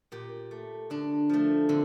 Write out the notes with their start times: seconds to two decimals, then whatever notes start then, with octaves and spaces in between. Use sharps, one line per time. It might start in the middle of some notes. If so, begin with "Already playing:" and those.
0.12 A#2 G4
0.51 A3
0.90 D3 D4
1.29 F3 A3
1.69 D3 C4